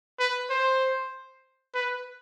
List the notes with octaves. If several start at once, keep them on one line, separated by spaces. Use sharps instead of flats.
B4
C5
B4